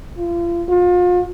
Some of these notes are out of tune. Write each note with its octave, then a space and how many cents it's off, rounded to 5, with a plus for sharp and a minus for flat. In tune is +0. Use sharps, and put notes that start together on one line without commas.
F4 -35
F4 +35